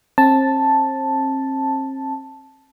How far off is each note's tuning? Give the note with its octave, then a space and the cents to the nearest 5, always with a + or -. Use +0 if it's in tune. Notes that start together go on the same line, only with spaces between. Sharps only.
C4 +40 A5 +0